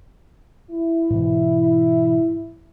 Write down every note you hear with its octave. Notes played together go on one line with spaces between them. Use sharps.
E4
G#2 B2 E3